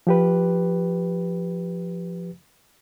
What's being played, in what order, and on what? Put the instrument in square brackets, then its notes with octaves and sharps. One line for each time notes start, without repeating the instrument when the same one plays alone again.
[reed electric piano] F3 G4 B4